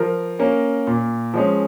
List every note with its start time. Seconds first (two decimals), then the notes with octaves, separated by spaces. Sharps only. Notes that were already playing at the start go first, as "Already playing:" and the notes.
Already playing: F3 A#4
0.39 A#3 C#4
0.87 A#2
1.34 F3 G#3 C#4